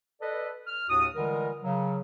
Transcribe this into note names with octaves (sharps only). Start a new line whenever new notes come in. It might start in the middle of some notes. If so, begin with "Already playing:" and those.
A4 B4 D5 D#5
F6
D#2 A2 D4 F#4 D#6
D3 E3 G3 G#3 F4 A#4
C#3 F#3